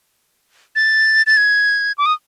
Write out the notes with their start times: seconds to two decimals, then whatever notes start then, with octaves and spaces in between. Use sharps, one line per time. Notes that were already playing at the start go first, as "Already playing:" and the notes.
0.76 A6
1.26 A6
1.37 G#6
1.98 D6
2.06 D#6